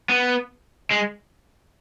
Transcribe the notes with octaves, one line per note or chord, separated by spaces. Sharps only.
B3
G#3